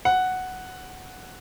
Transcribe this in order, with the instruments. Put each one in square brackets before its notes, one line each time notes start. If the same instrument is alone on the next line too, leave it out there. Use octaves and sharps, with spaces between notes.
[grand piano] F#5